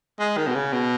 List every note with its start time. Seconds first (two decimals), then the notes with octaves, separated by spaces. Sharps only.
0.19 G#3
0.37 D#3
0.47 B2
0.55 C#3
0.72 B2